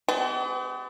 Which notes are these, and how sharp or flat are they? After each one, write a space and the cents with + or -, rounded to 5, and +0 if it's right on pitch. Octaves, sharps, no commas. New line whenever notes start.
G#3 -10 B3 +40 G4 -45